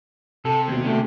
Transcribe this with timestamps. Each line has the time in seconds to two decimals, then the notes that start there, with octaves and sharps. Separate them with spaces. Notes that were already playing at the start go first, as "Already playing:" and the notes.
0.45 C3 A4
0.68 D#2 B2
0.84 B2 D3 A3